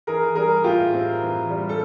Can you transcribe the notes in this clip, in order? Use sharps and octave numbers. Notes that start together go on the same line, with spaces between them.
E3 G#4 A#4
G3 G#4 A#4
A2 F4 G4
C4
E3
G3
A4